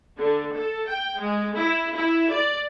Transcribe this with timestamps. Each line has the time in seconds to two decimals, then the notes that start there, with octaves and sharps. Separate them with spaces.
0.17 D3
0.55 A4
0.89 G5
1.19 G#3
1.56 E4
1.97 E4
2.31 D5